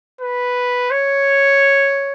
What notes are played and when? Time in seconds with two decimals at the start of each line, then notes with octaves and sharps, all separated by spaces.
0.21 B4
0.91 C#5